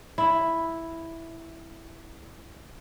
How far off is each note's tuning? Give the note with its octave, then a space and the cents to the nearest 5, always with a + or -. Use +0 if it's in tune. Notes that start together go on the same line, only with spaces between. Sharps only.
E4 +0